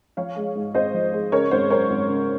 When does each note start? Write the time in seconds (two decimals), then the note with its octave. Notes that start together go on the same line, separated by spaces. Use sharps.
0.17 F3 C#5 F5
0.36 G#3
0.55 G#2
0.74 G#1 C5 D#5
0.94 F3
1.13 G#3
1.32 C#3 A#4 C#5
1.51 G#1 C5
1.70 F#2 A#4 C#5
1.89 G#1
2.08 C#3